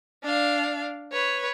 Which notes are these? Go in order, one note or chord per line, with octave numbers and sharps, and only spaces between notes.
D4 F5
B4 C#5